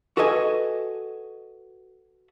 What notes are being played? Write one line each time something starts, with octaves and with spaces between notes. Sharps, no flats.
F#4 A4 B4 D#5 G#5